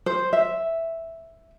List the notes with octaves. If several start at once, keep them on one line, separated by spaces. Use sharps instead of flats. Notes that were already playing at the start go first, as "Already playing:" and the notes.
C5
E5